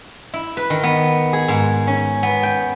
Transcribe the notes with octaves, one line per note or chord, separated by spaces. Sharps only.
E4
B4
D#3
B3
G#4
G#2
C#4
B3
G5